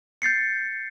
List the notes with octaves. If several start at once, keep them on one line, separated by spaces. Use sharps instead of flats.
G6 A6 C7 C#7